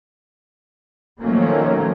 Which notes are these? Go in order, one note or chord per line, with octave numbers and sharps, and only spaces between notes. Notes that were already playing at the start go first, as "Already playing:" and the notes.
D#3 F3 F#3 A3 A#3 C#4